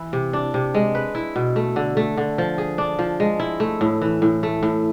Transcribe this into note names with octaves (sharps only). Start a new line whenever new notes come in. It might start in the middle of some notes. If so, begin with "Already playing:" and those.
Already playing: E3 E4
C3
D4
C3
G#3
B4
E4
B2
A3
D3
A3
D3
F3
G#4
D4
F3
G#3
E4
A3
A2
E3
A2
A3
A2